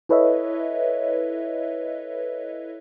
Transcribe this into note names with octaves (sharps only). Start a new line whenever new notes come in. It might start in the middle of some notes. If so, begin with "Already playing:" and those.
E4 A4 B4 C#5 D#5 E5